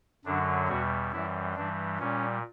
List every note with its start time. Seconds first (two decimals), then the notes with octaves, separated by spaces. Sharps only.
0.25 F#2 D3 F#3 D4
0.68 E2 B2 G3 F#4
1.12 F#2 E3 G3 E4
1.55 G2 E3 G3 D4
1.99 A#2 G3 C#4